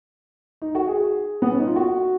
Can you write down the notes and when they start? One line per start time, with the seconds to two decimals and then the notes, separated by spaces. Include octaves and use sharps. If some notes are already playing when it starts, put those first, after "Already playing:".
0.62 D#4
0.75 F#4
0.88 G#4
1.42 B3
1.50 C#4
1.59 D#4
1.67 F4
1.76 F#4